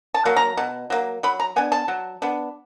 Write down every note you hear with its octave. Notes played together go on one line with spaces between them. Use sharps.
A5
F#3 A#3
A#5
B2
F#3 A#3
F#3 B5
A#5
B3 D4 G#5
A5
F#3
B3 D4